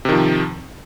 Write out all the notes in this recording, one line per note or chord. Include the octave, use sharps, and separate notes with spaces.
C3 D#3 F3